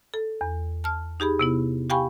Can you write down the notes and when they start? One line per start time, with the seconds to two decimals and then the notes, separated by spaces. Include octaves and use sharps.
0.14 A4
0.41 E2
0.84 A5 F6
1.20 D#4 G4 G#4 B5
1.39 C3 B3 E4
1.90 G4 F5 G5 G#5 B5 C#6